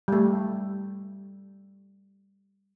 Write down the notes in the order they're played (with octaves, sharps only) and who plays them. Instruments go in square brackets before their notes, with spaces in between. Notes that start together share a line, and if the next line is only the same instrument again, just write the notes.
[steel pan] G3 A3